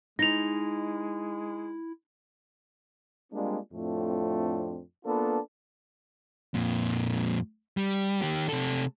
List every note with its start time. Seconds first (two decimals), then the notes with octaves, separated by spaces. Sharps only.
0.19 G#3 D#4 E4 A#6 F7
3.32 G3 G#3 A#3 C4 D4 F4
3.72 F2 A2 A3 C4 D4 F4
5.05 A#3 B3 D4 F4 A4 B4
6.54 F2 A#2
7.77 G3
8.22 D#3 G4
8.49 C3 A4